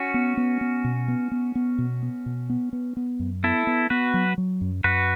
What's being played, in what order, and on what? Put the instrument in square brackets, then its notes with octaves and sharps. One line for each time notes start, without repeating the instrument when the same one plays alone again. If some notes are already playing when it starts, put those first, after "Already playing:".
Already playing: [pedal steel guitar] C#4 F#4
[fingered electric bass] B3
B3
B3
B2
B3
B3
B3
B2
B3
B2
B3
B3
B3
F#2
[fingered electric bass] B3 [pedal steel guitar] E4 A4
[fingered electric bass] B3
[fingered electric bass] B3 [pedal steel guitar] F#4 B4
[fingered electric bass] F#3
F#3
F#2
[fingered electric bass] F#2 [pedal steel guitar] F#4 B4